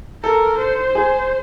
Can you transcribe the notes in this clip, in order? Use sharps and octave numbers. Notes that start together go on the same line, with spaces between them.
A4 A#4
C5
G#4